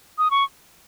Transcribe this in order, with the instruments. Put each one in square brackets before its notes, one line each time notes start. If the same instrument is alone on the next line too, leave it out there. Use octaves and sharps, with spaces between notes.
[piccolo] D#6
C#6